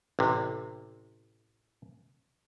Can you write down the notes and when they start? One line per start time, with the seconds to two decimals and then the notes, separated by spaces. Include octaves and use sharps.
0.19 A1 C3